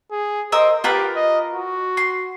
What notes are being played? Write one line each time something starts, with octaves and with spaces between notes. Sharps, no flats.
G#4
A#4 C5 D#5 E6
F4 G4 A#4 B4
D#5
F#4
C6